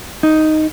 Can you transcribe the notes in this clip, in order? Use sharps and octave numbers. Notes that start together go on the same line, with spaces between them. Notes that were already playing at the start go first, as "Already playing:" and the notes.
D#4